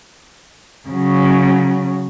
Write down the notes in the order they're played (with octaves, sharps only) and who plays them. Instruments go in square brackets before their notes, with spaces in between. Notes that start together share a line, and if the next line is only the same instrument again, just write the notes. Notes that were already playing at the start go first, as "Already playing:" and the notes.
[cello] C#3 F#3